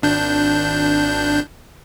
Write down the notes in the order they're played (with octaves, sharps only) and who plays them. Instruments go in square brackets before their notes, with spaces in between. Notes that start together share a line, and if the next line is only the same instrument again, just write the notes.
[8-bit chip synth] G#1 D4 G6